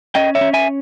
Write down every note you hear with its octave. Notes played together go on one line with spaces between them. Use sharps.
C#4 D#5 G5
C#5 E5
C#4
E5 G#5